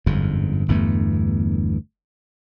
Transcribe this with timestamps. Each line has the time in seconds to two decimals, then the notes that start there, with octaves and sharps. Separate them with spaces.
0.06 G1 F2 G#2
0.68 G1 E2 G2 A3